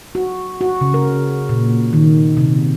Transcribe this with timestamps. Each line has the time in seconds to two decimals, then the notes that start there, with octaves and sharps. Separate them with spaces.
0.15 F#4
0.61 F#4
0.81 C#3
0.94 A#4
1.49 A#2
1.93 D#3
2.37 C3